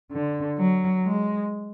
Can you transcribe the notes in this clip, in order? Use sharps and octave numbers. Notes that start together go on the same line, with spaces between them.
D3
F#3
G#3